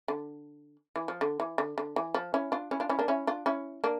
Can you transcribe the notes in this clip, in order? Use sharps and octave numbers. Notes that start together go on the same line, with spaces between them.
D3
E3
F3
D3
E3
D3
D3
E3
F3
C#4 E4
D4 F4
C#4 E4
D4 F4
C#4 E4
A#3 D4
C#4 E4
D4 F4
C#4 E4
A#3 D4